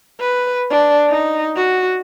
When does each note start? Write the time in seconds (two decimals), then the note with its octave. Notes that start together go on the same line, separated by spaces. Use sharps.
0.20 B4
0.70 D4
1.10 D#4
1.56 F#4